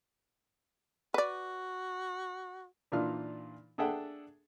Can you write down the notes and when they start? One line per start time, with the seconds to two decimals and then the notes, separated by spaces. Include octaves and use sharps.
1.14 F#4 B4 D5
2.92 A#2 E3 D4 D#4 F4 F6
3.78 D4 G#4 A4 E5 F#5 G5